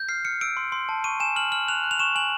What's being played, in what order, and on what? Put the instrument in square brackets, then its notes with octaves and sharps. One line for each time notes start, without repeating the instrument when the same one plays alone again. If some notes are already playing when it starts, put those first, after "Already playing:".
Already playing: [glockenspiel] G6
F6 C7
F6 C#7
E6 D7
C6
C6
A5
C#6 D#7
G#5 E7
F6 F#7
F6 F#7
F#6 F7
F#6
F7
C#6 E7
G#5 F#7